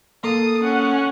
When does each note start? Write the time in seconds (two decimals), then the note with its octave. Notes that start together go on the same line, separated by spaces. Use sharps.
0.24 A#3 A4 F5 A#5 D#6
0.63 C#4 F#5